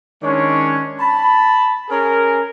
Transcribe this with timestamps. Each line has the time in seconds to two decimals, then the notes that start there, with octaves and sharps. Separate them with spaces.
0.22 D#3 G#3 C#4 D4 C#5
0.99 A5 B5
1.89 C#4 G#4 A#4